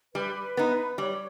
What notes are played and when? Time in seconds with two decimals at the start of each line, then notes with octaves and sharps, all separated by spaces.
0.15 G3 B4
0.57 B3 D#4
0.98 G3 C#5